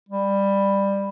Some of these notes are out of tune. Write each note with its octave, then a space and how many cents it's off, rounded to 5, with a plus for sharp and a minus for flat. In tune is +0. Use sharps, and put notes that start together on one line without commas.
G3 +15